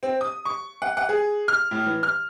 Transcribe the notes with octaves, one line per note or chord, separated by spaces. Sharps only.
C4
D#6
C#6
F#5
F#5
G#4
F6
A2
E3
F6